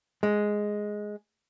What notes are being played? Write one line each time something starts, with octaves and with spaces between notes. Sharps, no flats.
G#3